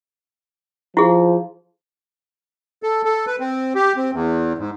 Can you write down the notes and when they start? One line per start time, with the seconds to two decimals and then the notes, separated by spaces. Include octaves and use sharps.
0.97 F3 E4 G#4
2.83 A4
3.05 A4
3.26 B4
3.40 C4
3.75 G4
3.96 C4
4.13 E2
4.58 G#2